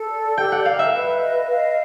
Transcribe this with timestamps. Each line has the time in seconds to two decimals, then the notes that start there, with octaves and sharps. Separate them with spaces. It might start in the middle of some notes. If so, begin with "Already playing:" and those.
Already playing: A4
0.10 D5
0.38 G4 G5
0.52 F#5
0.65 A#4 F5
0.79 E5
0.93 B4
1.21 D#5
1.49 F5